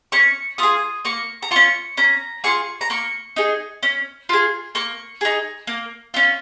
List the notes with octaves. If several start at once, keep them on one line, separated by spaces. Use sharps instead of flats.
C#4 C#6
F4 G#4 D#6
A#3 C#6
A#5
C#4 F4 C#6
C#4 A#5
F4 G#4 C#6
A#5
A#3 C#6
D#4 G#4
C#4
F4 G#4
A#3 C#6
D#4 G#4
A#3
C#4 F4